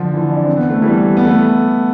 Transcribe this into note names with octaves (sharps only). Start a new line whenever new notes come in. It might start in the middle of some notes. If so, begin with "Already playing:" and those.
Already playing: D3 F3
E3
D4
C4
B3
A3
E3 G3
B3
A3